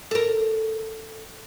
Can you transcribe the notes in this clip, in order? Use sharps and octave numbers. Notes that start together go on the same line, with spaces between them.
A4 A#4